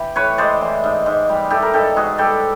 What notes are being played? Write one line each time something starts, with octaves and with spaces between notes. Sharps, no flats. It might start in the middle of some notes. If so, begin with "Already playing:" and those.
Already playing: E3 G4
A2 B4 C#5
G#3 C5 D5
E3
G#2
G#2
G3
E3 G4 A4
A#4
G#2 G4 A4
G#2 F#4 G#4
G3 G4 A4